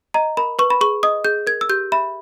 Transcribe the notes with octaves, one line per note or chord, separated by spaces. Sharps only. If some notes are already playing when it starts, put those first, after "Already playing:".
D#5 A#5
A#4 B5
B4 C#6
B5
G#4 C#6
D#5 D#6
G#4 G6
A#4 G#6
E6
G4 G6
E5 B5